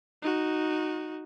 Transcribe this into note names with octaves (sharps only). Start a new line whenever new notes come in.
D#4 F#4